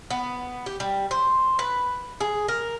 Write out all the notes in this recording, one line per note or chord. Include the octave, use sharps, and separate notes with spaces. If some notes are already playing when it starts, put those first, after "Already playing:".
B3
G4
G3
C5
B4
G#4
A#4